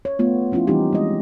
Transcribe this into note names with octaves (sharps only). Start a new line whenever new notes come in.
C#5
A3 B3 F4
F3 C#4 E4 F4
E3 G3 C4 D#4 G4
G#3 D#5